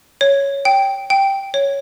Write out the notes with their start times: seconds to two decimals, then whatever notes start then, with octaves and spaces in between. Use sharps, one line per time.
0.21 C#5
0.65 G5
1.10 G5
1.54 C#5